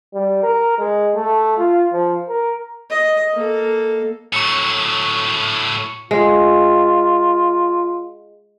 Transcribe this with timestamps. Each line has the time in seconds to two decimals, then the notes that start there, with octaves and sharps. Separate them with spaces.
0.14 G3
0.43 A#4
0.78 G#3
1.15 A3
1.57 F4
1.92 F3
2.29 A#4
2.90 D#5
3.33 A#3 A4
4.33 A2 F#3 C#6 C#7
6.11 G#3 F4